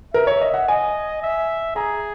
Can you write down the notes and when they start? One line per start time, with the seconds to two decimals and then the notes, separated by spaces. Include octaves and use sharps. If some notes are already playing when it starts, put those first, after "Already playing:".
0.14 A#4 E5
0.27 C#5
0.41 D#5
0.54 F#5
0.68 D#5 G#5
1.22 E5
1.76 G#4 A#5